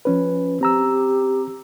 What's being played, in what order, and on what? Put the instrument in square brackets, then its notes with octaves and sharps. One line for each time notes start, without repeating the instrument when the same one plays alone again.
[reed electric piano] F3 C#4 B4
[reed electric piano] C4 A#5 E6 [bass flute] G4